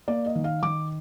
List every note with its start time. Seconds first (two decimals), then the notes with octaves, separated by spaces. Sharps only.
0.08 A#3 D5
0.26 D#5
0.35 D#3
0.44 F5
0.63 D#3 D6